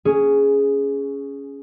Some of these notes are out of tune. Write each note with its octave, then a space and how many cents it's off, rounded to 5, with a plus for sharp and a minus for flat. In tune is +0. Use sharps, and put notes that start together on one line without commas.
C#4 +10 G#4 +0